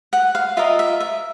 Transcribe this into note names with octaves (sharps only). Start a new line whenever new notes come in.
F#5
F5
F4 A#4 D#5 E5
E5
E5